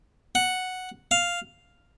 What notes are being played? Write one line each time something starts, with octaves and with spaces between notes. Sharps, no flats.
F#5
F5